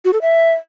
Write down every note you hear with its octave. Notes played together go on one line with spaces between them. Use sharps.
F#4
A4
E5